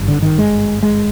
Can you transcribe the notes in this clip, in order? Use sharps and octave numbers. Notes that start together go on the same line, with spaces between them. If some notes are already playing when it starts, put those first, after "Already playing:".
Already playing: G#1 G2
D3
D#3
G#3
G#3